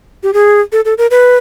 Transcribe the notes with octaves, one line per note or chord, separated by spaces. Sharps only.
G4
G#4
A4
A4
A#4
B4